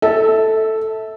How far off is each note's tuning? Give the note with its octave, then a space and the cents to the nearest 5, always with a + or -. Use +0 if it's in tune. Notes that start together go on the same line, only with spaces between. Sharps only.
A4 +0 E5 -25